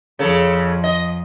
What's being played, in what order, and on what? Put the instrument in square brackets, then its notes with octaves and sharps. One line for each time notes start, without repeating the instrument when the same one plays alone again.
[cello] F2 F3 [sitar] C#3 A4
[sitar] D#5